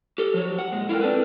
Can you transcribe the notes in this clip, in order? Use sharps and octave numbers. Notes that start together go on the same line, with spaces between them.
G4 A4
F3 F#3 C#5
F#5
A#2 G#3
E4 F4 A4 A#4 G5
C4 D4 A4 B4